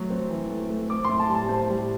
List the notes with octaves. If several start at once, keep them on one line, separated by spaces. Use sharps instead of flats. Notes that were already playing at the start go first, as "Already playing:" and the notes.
Already playing: F#3 A3
C4
E3
A3
A3
C4 D6
A2 C6
A5
G3
A5
A2 C5
G3